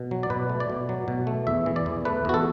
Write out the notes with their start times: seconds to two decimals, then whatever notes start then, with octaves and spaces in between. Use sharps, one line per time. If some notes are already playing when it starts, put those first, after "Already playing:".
Already playing: B2
0.11 F#3
0.23 D5
0.30 B2 B4
0.49 A3
0.60 D5
0.70 B2
0.89 F#3
1.08 B2
1.27 A3
1.47 E2 E5
1.66 E3
1.76 D5
1.86 E2
2.05 A3 B4
2.25 E2 F#4
2.34 A4